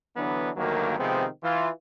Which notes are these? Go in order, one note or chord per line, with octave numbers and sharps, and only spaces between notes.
D3 E3 F#3 B3 D4
D2 G2 D#3 F#3 A#3
C3 D#3 F3 G#3 B3 C4
E3 F4